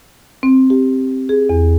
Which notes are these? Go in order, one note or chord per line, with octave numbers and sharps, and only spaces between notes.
C4
G4
G#4
E2